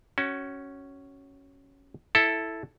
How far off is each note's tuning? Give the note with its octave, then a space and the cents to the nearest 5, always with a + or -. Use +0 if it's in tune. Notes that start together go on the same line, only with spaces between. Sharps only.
C#4 +0 F#4 +20
E4 +0 A4 +0